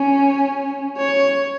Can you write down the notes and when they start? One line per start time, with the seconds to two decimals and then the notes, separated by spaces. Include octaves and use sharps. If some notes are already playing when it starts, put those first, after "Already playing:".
Already playing: C#4
0.98 C#5